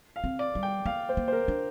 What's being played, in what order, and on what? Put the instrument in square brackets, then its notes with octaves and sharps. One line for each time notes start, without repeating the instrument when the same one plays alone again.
[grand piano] F5
[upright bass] C4
[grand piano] D5
[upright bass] G3
[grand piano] G5
[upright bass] A#3 [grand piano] F5
[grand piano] C5
[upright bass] A#3
[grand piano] C5
A#4
[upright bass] D4